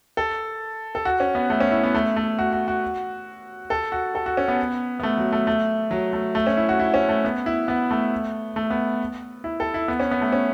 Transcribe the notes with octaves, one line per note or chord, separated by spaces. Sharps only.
A4
A4
F#4
C#4
B3
A3
C#4
E4
B3
A3
A3
F#4
F#4
F#4
A4
F#4
A4
F#4
C#4
B3
B3
A3
F#3
A3
A3
F#3
A3
A3
C#4
E4
F#4
E4
C#4
A3
B3
E4
B3
A3
A3
B3
E4
A4
E4
B3
C#4
B3
A3
C#4